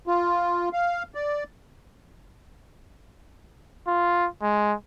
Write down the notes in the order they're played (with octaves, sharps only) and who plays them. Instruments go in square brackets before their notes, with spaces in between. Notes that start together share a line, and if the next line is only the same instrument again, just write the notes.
[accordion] F4
F5
D5
[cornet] F4
G#3